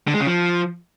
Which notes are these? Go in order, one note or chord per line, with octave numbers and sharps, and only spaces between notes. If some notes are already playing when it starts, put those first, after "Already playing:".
D3
G#3
C#3
F3